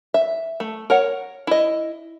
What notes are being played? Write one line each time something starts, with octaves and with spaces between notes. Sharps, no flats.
E5
A3
A#4 C#5 F#5
E4 D#5